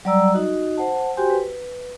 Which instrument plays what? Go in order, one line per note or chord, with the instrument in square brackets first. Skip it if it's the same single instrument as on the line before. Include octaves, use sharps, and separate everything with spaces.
[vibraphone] F#3 G3 D5 A#5 E6
D#4 F#4 D#5
C5 F#5 A5
F#4 G4 C5 G5 G#5 C6
B4